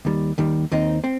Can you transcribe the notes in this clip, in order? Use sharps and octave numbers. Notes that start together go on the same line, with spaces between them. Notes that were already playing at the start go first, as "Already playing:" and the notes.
D#2 D#3 G3
D#2 D#3 G3
D#2 D#3 C4 D#4
C4